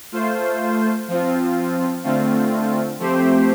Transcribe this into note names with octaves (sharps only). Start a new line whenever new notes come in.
A3 F4 C5
F3 C4 F4
D3 A3 C4 F4
F3 A3 C4 G4 C5